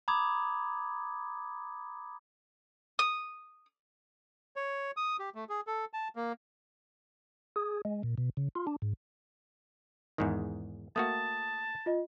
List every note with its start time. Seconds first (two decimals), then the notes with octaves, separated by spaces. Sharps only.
0.08 A#5 B5 D6 D#6 G#6
2.99 D#6
4.56 C#5
4.97 D#6
5.19 G4
5.35 A3
5.49 G#4
5.67 A4
5.93 A5
6.16 A#3
7.56 G#4
7.85 G#3
8.03 A#2
8.18 B2
8.37 C#3
8.55 F4
8.67 D4
8.82 G#2
10.18 E2 G#2 D#3
10.96 A3 A#3 F#4 A5 D#6
11.86 F4 D#5